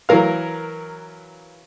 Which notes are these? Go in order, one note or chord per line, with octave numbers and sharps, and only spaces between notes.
E3 F#3 A#4 F5